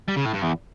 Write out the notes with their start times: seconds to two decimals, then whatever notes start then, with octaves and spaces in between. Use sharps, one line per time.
0.09 G3
0.17 C#3
0.26 A2
0.35 G2
0.43 E2